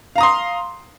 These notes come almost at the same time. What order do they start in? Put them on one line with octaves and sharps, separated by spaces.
F5 A#5 D#6 C6